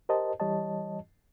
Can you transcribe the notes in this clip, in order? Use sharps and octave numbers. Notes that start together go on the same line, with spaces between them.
G4 A#4 C5 D#5 A5
E3 G3 G4 C#5 D#5 A5